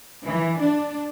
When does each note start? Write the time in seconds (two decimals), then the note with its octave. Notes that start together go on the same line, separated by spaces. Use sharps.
0.24 E3
0.60 D4